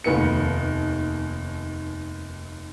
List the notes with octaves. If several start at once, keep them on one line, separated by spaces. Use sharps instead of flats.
F1 D#2 B3 C#7